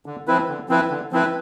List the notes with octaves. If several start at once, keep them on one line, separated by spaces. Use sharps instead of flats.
D3
F3 C4 E4 B4
D3
F3 C4 E4 B4
D3
F3 C4 E4 B4